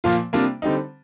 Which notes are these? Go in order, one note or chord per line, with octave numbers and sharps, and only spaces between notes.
A#2 F3 A#3 F4
C3 G3 A#3 D4 F4
D3 G3 C4 D#4